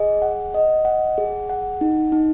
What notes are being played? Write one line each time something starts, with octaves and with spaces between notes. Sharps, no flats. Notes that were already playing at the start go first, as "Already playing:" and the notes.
Already playing: G#4 D#5
F#5
D#5
F#5
G#4
F#5
D#4
D#4